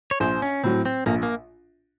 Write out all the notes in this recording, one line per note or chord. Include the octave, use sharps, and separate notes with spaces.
C#5
A#1 C5
C#4
A2 F#3 C4
C4
A#1 A#3
A#3